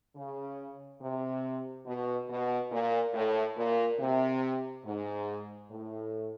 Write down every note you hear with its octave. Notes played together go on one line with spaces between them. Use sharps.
C#3
C3
B2
B2
A#2
A2
A#2
C3
G#2
A2